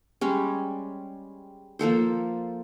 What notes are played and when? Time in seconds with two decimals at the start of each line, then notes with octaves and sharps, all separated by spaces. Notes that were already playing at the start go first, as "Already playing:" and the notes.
0.21 G3 G#3 C#4
1.79 F3 A#3 A4 C5